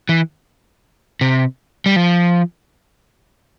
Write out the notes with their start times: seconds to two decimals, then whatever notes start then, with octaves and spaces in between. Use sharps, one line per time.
0.09 E3
1.21 C3
1.86 G3
1.96 F3